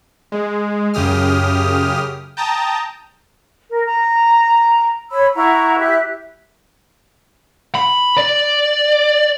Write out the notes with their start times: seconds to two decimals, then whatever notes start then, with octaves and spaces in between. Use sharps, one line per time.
0.32 G#3
0.94 F#2 C#3 G4 D#6 F6
2.37 G5 A5 A#5 D#6
3.70 A#4
3.86 A#5
5.11 C#5 B5 E6
5.36 E4 F#5 A#5 C#6
5.78 G4 E5 F#6
7.75 B5
8.17 D5